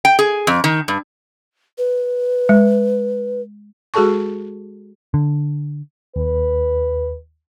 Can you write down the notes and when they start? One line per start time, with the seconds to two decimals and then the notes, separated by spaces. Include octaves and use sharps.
0.05 G5
0.19 G#4
0.47 F2
0.64 D#3
0.88 G2
1.78 B4
2.49 G#3
3.94 G#3 F#4 G#4 A4 A5 C#6
5.14 D3
6.16 D#2 B4